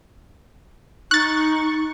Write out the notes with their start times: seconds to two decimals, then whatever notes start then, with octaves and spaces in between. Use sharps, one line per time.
1.11 D#4 C#6 F#6 A6